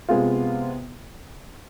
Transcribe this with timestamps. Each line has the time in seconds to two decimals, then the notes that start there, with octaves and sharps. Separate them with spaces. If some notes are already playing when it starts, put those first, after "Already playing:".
0.09 C3 G#3 B3 F4